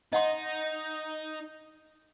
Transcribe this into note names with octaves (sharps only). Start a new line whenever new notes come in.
D#4 D#5 F#5 C6